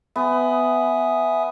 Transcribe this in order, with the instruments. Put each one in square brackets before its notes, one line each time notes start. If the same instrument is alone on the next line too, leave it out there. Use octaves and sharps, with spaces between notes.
[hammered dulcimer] B3 [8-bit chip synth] E5 G#5 D#6